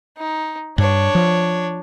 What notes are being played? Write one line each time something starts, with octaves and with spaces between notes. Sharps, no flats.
D#4
G2 D4 C#5
F3